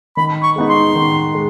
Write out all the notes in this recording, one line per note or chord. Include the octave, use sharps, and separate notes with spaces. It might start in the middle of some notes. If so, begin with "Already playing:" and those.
D#3 B5
C#6
G#3 B3 D#4
C6
D#3
G#3